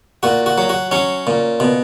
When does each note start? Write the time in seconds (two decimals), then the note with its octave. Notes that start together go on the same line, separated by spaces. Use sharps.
0.23 A#2 F#4
0.46 F#4
0.58 F#3
0.69 F#4
0.91 F#3 C#4
1.27 A#2
1.60 B2